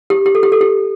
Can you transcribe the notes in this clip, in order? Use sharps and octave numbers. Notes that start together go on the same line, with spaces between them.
G4
G4
A4
G4
A4
G4